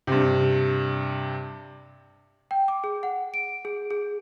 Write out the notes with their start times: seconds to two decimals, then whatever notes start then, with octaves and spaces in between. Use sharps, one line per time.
0.07 G2 C3
2.51 G5
2.68 D6
2.84 G#4
3.03 F#5
3.34 D7
3.65 G#4
3.91 G#4